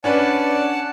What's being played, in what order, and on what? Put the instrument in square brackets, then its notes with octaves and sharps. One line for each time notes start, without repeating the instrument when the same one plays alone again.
[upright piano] C#4 D4 B4 [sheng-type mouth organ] D5 F#5 A5